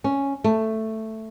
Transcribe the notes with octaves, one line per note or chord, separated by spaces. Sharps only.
C#4
A3